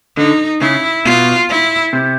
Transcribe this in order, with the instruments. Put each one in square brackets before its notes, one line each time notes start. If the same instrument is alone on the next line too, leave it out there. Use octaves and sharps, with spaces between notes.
[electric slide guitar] D3 [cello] D#4
[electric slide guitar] C#3 [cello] E4
[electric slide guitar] B2 [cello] F4
[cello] E4
[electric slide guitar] C3